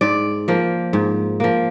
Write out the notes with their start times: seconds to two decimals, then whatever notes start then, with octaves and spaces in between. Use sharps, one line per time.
0.01 G#2 D5
0.48 F3 A#3
0.93 G#2
1.40 F3 A#3